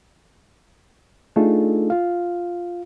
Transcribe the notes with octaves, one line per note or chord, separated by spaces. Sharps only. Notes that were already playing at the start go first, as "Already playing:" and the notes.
A3 D4 D#4 F4 G#4 A4
F4 F5